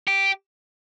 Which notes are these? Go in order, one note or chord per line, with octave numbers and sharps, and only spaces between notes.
G4